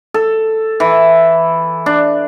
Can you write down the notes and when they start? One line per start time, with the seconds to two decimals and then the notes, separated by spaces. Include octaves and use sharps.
0.14 A4
0.80 E3
1.86 D4